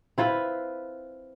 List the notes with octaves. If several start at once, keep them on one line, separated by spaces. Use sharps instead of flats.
C4 E4 F4 B4